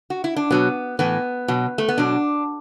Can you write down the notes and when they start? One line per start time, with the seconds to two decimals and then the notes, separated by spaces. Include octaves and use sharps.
0.10 F#4
0.24 E4
0.36 D4
0.51 B2 F#3 B3
0.99 A2 E3 B3
1.48 B2 F#3
1.78 A3
1.88 B3
1.98 B2 F#3 D4